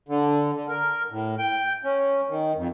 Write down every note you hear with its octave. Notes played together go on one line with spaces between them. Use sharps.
D3
D3
A#4
A2
G5
C#4
D#3
F2